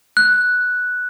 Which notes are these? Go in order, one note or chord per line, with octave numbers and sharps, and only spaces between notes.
F#6